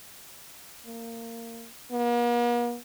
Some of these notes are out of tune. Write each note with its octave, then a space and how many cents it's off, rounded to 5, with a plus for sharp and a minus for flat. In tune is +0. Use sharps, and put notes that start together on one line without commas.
A#3 -20
A#3 +45